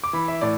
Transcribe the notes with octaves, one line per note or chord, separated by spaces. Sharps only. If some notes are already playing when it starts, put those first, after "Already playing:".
D6
E3 B5
E5
A2 D5